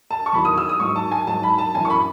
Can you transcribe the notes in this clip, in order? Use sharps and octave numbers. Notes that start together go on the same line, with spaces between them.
A5
C#6
E2 D#3 F#3 B5
D#6
E6
D#6
G#2 F#3 C#6
A5
G#5
G#2 F#3 A5
B5
A5
F#2 E3 G#5
C#6
B5